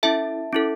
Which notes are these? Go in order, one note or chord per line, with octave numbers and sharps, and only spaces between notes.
C#4 E4 A4 E5 A5
C#4 E4 A4